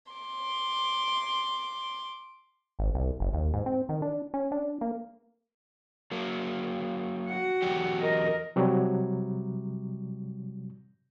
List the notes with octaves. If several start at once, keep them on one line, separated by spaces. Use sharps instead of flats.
C6 D6
G#1
C2
F#1
D#2
G#2
C4
D#3
D4
C#4
D4
A#3
F#3 A#3
F#4 F#5
E2 F#3 G4
A#4 D#5
C3 F#3 G3